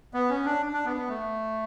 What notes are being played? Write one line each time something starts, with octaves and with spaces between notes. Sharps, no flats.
B3
C#4
D4
D4
B3
B3
A3